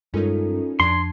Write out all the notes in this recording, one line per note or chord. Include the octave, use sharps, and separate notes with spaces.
G2 G#3 C#4 D#4 F4 A4 A#4
F2 D4 A5 C6 G#6